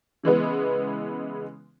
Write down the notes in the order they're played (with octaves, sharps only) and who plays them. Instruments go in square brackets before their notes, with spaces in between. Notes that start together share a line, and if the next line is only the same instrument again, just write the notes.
[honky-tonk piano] C#3 E3 G#3 B3